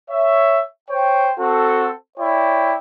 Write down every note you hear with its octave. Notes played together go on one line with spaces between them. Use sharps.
C#5 E5
C5 C#5 G5
C4 F#4 A4
E4 C#5 D5 G5